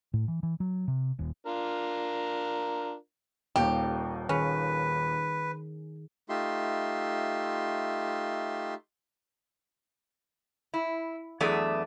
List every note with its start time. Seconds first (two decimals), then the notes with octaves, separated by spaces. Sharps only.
0.14 A2
0.28 E3
0.43 E3
0.60 F#3
0.88 C3
1.19 D#1
1.46 D4 F4 A#4
3.56 D#1 D#2 G4
4.29 D#3 C#4 G#4 B4
6.29 A3 D#4 F4 G4 E5 C6
10.74 E4
11.40 E2 F#3 A3 B3 D4 G#4